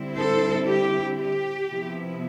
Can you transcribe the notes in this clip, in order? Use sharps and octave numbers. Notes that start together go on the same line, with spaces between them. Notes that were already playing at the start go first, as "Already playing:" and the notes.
Already playing: D3 G3 C4 E4
A4 C5
G4
G4
C3 F3 B3 E4